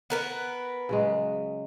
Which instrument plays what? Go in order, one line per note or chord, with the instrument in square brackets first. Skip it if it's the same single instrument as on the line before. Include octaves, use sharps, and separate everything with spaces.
[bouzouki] B3 A#4 B4
[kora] C#3 F#3 G#3